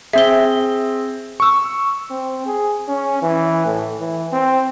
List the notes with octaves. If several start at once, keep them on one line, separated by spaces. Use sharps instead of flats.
C4 G#4 E5 G7
C#6 E6
C4
G#4
C#4
E3
A2
E3
C4